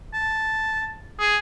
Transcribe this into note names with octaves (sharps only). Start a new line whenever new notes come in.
A5
G#4